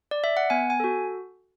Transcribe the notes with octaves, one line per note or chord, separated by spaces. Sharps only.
D5
E5
F#5
B3 G#5
G#5
F#4 A4